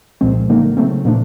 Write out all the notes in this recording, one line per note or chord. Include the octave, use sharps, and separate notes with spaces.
C2 A#2 F3 G#3 C4
D3 F#3 A#3 D#4
C#3 F#3 A3 C4
A#2 F3 A3 D4